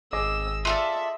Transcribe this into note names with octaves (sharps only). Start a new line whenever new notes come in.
G#1 G#4 D#5 D6 E6
F4 A4 D5 E5